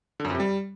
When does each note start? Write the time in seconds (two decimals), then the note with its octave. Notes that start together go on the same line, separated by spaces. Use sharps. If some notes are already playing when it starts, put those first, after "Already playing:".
0.20 D3
0.25 F#2
0.30 F2
0.35 C3
0.40 G3